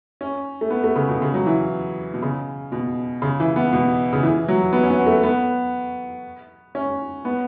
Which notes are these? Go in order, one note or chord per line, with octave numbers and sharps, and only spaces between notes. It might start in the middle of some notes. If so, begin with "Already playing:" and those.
C#4
A3
B3
A3
C#3
B2
C#3
F#3
E3
B2
C#3
B2
C#3
E3
B3
B2
C#3
E3
F#3
B3
C#4
B3
A3
B3
C#4
B3